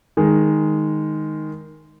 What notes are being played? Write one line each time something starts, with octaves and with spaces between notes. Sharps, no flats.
D#3 G#3